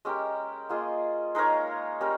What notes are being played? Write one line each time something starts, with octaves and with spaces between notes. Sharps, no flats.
G#3 C#4 G4 A#4
A#3 F4 G#4 D#5
G#3 D#4 A#4 C#5
G3 C#4 G4 A#4